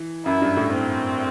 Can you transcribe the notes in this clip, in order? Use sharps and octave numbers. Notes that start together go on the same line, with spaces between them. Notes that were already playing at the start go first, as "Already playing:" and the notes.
Already playing: E3
F#2 E4
G2
A2
C4